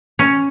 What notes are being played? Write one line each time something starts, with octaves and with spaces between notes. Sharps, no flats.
C#4